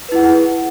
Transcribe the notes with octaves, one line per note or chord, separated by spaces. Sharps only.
E4 G#4 B4 F#5